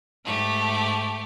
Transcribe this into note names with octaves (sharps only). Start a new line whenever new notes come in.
G#2 A3 G4